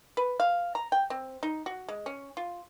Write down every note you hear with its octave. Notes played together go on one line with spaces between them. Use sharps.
B4
F5
A#5
G5
C4
D#4
F#4
G#3
C#4
F4